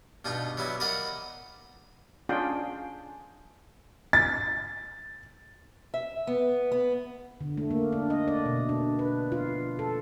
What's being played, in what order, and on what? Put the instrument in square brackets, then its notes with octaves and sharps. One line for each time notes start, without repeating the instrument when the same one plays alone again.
[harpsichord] G2 B2 D#4 F4 C#6
F#3 G3 B3 E4
A#4 D5 D#5 F5 F#5 B5
[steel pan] C#4 D4 F4 G#4 G5
[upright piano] A6
[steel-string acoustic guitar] E5
B3
B3
[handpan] D3
A3
A#3
D4
D#5
D5
B2
D4
B4
F4
A4